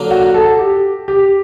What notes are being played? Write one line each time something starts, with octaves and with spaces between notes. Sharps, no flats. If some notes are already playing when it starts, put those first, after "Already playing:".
Already playing: D3 F#3 A#3 D4
F#4
A4
G4
G4